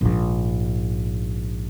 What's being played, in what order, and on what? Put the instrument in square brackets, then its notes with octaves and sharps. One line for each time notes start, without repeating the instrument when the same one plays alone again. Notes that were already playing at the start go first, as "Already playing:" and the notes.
[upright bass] A#1 G#2